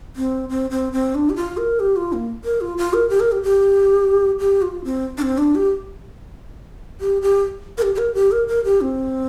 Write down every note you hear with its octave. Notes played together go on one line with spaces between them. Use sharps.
C4
C4
C4
C4
D4
G4
F4
A#4
G4
F4
A#3
A#4
F4
F4
A#4
G4
A#4
G4
G4
G4
F4
C4
D4
C4
D4
G4
G4
G4
A#4
G4
G4
A#4
G4
A#4
A#4
G4
C4